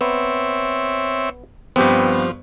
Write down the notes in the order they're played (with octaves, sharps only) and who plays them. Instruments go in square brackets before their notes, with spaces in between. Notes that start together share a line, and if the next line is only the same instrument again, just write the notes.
[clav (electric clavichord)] B3 [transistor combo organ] C4 C#5 E5
[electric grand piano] G2 B3 [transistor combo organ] F3 [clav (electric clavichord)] C4 G4